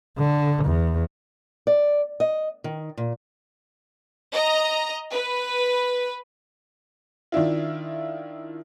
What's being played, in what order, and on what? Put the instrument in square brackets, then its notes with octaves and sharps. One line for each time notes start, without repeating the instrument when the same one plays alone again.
[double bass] D3
E2
[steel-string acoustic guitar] D5
D#5
D#3
A#2
[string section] D#5 A#5
B4
[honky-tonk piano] D#3 D4 E4 F4